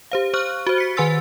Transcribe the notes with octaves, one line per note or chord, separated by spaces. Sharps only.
G4 C5 F5
C5 C#6 F6 F#6
F#4 C5
B6 C#7
D#3 B4 G#5 C6 E6 A6